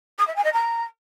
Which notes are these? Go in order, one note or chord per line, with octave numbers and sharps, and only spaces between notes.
D#6
E5
G#5
D#5
A#5